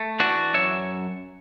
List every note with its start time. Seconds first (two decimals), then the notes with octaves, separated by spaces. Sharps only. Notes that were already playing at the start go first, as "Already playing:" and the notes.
Already playing: A3
0.20 E3 D4 F#4
0.54 F#2 C#5 E5